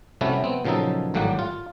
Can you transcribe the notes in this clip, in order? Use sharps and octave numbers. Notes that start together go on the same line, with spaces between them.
C3 G3 A3 C#4 E4 F#4
B3 C4
A#2 C#3 F3 F#3 D#4 A4
G#1 A2 F#3 G3 A#3 F#5
F4